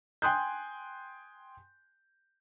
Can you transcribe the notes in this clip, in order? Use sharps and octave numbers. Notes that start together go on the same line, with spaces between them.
G5 G#5 C6 D#6 F#6 G6